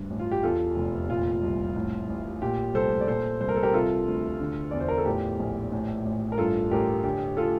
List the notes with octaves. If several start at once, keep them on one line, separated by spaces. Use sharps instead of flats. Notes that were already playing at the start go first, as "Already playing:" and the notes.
Already playing: D2 G2
A1
F4
G4
E2 F4 A4
F1
A#2 F4
C2
A2
A1
A#2 G4
C2 A4 C5
D5
A#2 A4 C5
C2 C5
A#4
A4
G4 A#4
C3 F4 A4
D2
D3
E2 D5
C5
A#4
A4
A2 G4
A#1
A2
A1
A#4
G2 F4 A4
A1 G4 A#4
D3 G4
F4 A4